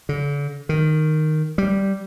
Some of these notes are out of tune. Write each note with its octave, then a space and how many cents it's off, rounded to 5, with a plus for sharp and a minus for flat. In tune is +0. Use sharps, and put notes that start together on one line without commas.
D3 -40
D#3 -5
G3 -5